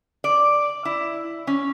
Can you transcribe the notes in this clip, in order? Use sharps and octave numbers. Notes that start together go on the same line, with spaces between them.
D5
E4
C#4